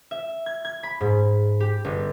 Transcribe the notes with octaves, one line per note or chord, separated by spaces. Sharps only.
E5
G#6
G#6
B5
G#2
G4
G1